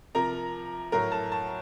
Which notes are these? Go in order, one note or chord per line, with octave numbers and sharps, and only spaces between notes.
C3 F3 A#4 A#5
A2 F#3 A#4 A#5
A5
A5